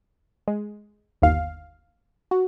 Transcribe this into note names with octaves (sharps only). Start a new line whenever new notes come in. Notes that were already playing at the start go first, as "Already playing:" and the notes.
G#3
G1 D#2 F5
F#4